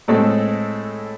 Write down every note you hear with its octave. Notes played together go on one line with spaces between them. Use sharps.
A2 G#3 A3 C4 G#4 A4